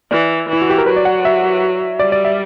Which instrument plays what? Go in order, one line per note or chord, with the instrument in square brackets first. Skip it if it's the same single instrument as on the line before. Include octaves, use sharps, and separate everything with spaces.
[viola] E3 [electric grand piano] D5
[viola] E3 [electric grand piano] E4
[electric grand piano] F#4
G4
A#4
[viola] F#3 [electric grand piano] B4
[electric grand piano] D5
F#5
E5
[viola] G3 [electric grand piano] D5
[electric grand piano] D5
E5